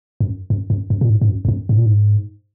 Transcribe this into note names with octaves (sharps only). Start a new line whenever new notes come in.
F#2
F#2
F#2
F#2
A#2
G#2
G#2
F#2
E2
F#2
G#2
A#2
G#2